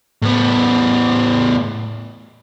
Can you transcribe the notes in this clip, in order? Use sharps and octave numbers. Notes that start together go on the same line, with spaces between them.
A2 B3